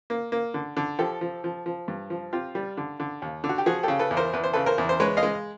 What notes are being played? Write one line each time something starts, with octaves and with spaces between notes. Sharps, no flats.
A#3
A#3
D3
D3
F3 G4 A4
F3
F3
F3
G2
F3
C4 F4 G4
G3
D3
D3
D#2
D3
F#4
G4
F3 F#4 G#4
C#3 G4 A4
A4 B4
E2
A#4 C5
E2 B4
C5
C#3 A4 B4
A#4 C5
E2
C5
G#3 B4 C#5
D#5 F5
G#3